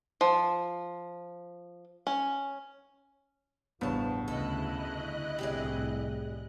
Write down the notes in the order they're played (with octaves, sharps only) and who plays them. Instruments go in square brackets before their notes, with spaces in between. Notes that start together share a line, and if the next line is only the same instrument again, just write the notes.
[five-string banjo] F3
C#4
[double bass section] A1 F3 [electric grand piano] E2 G2 B3 [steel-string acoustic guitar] C#3 A5
[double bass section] D2 C#3 [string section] E4 D#5 F#6 [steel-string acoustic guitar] A4
[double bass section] F1 C2 A2 [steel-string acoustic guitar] G4 G#4 D5